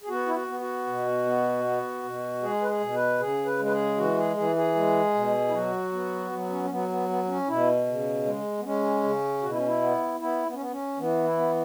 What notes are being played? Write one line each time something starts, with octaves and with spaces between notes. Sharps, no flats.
G#4
B3 F#4
E4
F#4
B3
F#4
B2
B3
B3
B2
G#3 G#4
B4
G#4
B2
B4
C#3 G#4
B4
G#3
B4
G#4
E3 F#4
G#4
E3 G#4
G#4
G#3
B2
E4
F#3 F#4
B3
F#3
C#4
C#4
F#3 B3
B3
B3
B3
C#4
B2 E4
C#3
G#3
B3
G#3 C#4
C#3
B2 F#4
E4
C#4
E4
B3
B3 E4
B3
C#4
B3
C#4
E3 B3
E4
B3